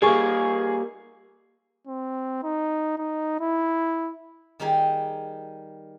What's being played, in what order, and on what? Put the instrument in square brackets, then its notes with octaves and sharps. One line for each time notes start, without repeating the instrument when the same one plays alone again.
[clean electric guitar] G3 A#3 [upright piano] G#4 G#5 C#6
[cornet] C4
D#4
D#4
E4
[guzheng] D#3 G3 D#4 G4 G#4